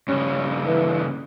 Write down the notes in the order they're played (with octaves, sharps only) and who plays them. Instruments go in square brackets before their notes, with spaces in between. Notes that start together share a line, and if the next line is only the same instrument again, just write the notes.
[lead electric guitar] G2 C#3 [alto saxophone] C#4
[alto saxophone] E3